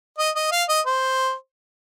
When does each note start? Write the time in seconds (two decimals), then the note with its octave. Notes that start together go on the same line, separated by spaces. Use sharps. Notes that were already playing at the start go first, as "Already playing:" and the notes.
0.18 D#5
0.36 D#5
0.52 F5
0.69 D#5
0.86 C5